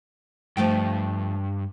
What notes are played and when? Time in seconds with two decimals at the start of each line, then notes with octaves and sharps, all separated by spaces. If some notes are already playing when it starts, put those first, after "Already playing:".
0.57 G2 F3 A3 G5